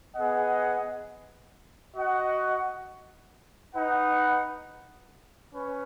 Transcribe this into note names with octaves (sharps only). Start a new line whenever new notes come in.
B3 G#4 D#5 F#5
F#4 D#5 F#5
D#4 B4 F#5
C#4 B4